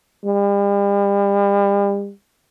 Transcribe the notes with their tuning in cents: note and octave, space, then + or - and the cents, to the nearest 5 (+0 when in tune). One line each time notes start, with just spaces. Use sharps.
G3 +40